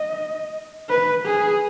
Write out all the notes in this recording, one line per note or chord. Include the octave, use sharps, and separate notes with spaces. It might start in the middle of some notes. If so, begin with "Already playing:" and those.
Already playing: D#5
B4
G#4